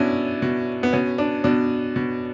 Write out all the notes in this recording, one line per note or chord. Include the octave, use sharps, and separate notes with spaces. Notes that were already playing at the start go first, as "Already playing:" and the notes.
Already playing: B2 C#4 D4 E4
B2
B3
B2 C#4
D4
B2 D4
B2